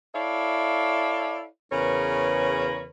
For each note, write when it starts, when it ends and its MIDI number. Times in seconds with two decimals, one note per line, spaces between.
0.15 1.45 64
0.15 1.45 69
0.15 1.45 73
0.15 1.45 74
0.15 1.45 76
0.15 1.45 77
1.72 2.89 40
1.72 2.89 49
1.72 2.89 70
1.72 2.89 71
1.72 2.89 73